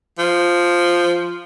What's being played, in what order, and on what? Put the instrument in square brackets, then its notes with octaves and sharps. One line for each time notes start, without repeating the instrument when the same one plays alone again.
[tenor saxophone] F3